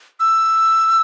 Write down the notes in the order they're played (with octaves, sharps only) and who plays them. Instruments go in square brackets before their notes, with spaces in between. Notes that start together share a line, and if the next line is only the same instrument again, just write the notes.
[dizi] E6